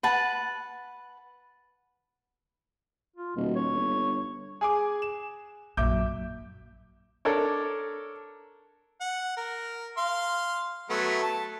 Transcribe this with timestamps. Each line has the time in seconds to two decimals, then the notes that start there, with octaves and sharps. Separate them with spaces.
0.03 B4 F#5 A5
3.16 F4
3.36 D#1 B2
3.56 C#5
3.72 G1
4.61 G#4 G#5 D6
5.02 E7
5.77 A#1 F#2 E5 D6 G6
7.25 D4 A4 A#4 C#5
9.01 F#5
9.37 A#4
9.97 F5 C6
10.90 F#3 A3 B3
11.23 A5